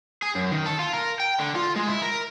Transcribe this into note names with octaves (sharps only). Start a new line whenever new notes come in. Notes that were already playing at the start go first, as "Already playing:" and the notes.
G#4
F#2
D#3
A4
F4
A#4
G5
D3
F4
G#3
E4
A#4